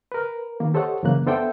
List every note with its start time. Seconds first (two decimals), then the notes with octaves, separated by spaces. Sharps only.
0.12 A#4 B4
0.60 D#3 A#3
0.74 G4 A4 C5 C#5 D#5 F#5
1.03 F#2 C#3 E3 A#3 F#6
1.27 B3 D4 A4 C5 E5 G5